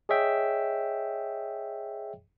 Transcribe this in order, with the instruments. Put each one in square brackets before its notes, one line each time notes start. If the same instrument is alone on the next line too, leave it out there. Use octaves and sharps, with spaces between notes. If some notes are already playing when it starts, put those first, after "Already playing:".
[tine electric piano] G#4 C#5 D#5 E5 G5